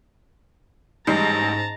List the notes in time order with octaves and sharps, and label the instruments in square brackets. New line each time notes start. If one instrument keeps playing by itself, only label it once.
[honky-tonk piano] A1 G3 C7 [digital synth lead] G#2 [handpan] D#4 [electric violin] A5 A#5